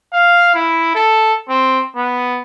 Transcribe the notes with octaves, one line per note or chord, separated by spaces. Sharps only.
F5
E4
A4
C4
B3